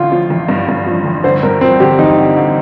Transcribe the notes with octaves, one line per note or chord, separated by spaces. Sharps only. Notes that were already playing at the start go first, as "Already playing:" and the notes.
Already playing: A1 D3 F4
F3
A1
G2
G2
F3
A1
D3 C5
G2 A#4
F3 C4
D3 G4
A1 D#4
D3
D3